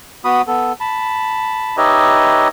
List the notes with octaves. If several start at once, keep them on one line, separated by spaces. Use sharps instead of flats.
B3 F#4 B5 D#6
B3 A4
A5 B5
D#4 G4 B4 C#5 D#5 E5